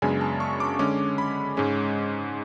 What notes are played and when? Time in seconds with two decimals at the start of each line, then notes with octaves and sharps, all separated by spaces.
0.02 F#2 C#3 G#3 B3 D4 G#5
0.21 A5
0.40 C#6
0.60 D6
0.79 D3 G#3 C#4 D6
1.18 B5
1.57 G#2 G#3 C#4